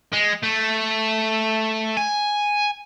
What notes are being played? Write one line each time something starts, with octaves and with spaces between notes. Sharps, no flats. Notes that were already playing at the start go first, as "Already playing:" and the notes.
G#3
A3
G#5